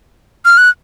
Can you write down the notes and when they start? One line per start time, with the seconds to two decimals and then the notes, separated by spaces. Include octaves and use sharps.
0.45 F6
0.58 F#6